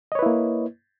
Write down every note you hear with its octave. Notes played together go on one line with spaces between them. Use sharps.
A#3 E4 B4 C#5 D#5